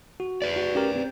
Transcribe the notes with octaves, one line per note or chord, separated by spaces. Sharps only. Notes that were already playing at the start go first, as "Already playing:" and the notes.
F#4
B4 D5
F#4
C#4 G4 A#4
C4